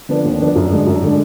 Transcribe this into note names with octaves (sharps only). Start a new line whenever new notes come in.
D3 F3 B3 D4
D#2
D3 F3 B3 D4
F#2
D3 G#3 D4
F#2
D3 G#3 D4